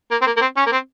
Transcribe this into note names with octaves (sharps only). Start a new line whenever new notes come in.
A#3
C4
A#3
A#3
C4
C#4
A#3
C4